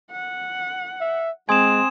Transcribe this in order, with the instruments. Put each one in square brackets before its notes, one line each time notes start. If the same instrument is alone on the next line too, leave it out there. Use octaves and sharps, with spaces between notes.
[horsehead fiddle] F#5
[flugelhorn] E5
[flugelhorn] G#3 [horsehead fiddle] C4 [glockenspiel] G#5 C6 D#6 [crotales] G#6 E7